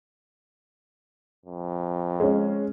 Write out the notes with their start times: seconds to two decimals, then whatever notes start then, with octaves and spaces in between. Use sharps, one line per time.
1.46 F2
2.20 G#3 C#4